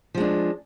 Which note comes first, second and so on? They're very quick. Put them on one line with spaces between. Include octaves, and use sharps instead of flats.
F3 G#3 D4